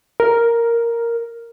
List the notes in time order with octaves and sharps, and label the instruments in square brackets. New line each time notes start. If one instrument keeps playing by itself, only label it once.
[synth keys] A#4